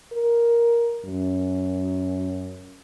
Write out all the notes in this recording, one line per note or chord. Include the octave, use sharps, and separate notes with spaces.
A#4
F#2